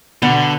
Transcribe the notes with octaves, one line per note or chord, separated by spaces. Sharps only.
B2 D3 B3